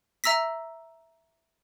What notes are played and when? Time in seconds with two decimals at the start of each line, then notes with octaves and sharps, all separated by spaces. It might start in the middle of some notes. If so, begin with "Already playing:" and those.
0.24 E5 A#5 E6 A#6 B6